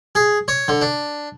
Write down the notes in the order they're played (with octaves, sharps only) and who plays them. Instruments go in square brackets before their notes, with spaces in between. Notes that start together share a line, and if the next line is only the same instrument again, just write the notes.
[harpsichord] G#4
C#5
D3
D4